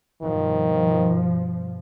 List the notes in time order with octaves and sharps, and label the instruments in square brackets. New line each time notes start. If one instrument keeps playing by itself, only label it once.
[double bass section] G2 B2 F3 [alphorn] D#3